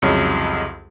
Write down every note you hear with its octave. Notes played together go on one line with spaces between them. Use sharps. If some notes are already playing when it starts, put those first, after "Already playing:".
C2 F2 C#3 F#3 G#3